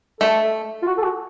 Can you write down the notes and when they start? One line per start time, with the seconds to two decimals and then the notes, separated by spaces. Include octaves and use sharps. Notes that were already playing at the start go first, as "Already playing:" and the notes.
0.20 A3 A4
0.82 F4
0.87 F#4
0.98 A4
1.03 F#4